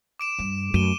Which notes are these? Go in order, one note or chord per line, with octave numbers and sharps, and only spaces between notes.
D6 D7 E7
G2
F#2 A3 D#7 E7 G7